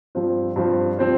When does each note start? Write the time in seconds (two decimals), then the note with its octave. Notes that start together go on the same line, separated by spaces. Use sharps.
0.15 G2 F3 C4 F4 C5
0.56 G2 F3 C4 F4 C5
0.99 F3 C4 F4 C5